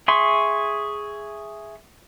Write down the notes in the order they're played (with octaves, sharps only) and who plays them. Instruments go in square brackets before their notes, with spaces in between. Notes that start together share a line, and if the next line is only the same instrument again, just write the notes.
[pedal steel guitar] G#4 E5 C6 C#6